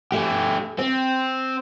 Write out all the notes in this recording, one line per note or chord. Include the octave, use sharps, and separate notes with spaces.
A3 G4
C4